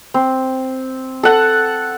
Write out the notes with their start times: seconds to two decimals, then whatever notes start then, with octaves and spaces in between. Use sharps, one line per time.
0.14 C4
1.23 A4 F#5